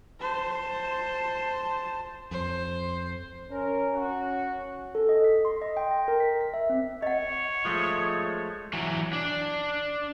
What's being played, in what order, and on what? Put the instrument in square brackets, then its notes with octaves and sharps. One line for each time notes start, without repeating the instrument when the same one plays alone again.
[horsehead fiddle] C5 A5
[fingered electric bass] F2 [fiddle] C5
[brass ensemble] C#4 A#4
C#4 F#4
[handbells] A4
D#5
B6
C6
D#5
G5
A#6
A#4
B6
B6
E5
C4
[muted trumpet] C#5 [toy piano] D#5 F#5
[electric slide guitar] F3 G#3 A3
[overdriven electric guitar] E3 F#3
D4